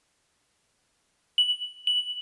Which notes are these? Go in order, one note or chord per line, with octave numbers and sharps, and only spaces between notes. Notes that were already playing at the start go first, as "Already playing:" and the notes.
F#7
F#7